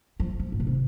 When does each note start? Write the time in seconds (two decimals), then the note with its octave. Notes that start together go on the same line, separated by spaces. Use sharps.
0.20 F3
0.39 F3
0.52 G#2
0.60 B2
0.67 C3